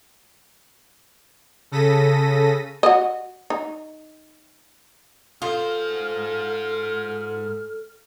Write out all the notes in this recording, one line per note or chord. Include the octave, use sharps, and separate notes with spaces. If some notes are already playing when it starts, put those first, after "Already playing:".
C#3 A4 A#6 B6 D#7
F#4 D#5
D#4
G#2 F4 A4 C5 F6